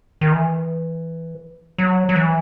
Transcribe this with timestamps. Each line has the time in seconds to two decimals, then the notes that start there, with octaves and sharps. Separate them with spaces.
0.21 D#3
0.33 E3
1.78 F#3
2.09 F#3
2.16 E3